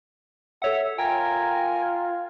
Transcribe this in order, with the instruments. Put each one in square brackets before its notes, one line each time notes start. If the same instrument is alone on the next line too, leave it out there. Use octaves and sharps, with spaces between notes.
[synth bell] A4 C#5 F#5 [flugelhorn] E5
[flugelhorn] F4 [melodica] A#4 G#5 [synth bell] G5